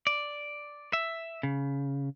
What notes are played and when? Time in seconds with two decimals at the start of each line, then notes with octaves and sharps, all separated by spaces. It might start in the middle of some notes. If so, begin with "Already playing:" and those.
0.07 D5
0.93 E5
1.43 C#3